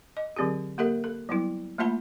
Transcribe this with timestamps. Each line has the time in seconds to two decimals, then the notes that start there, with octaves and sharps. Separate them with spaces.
0.17 D#5
0.36 D3 F#3 C4 G4 G#4
0.78 A#3 G4 A4 A#4 E5
1.04 A4
1.29 F#3 G3 B3 E4
1.78 A3 A#3 F4 E5 A5 B5